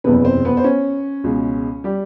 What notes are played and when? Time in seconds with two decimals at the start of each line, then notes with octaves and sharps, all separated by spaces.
0.04 F#1 E2 C3 B3 B4
0.24 C4 C5
0.45 B3 B4
0.57 C5
0.64 C#4 C#5
1.24 C#2 B2 G#3
1.84 G3 G4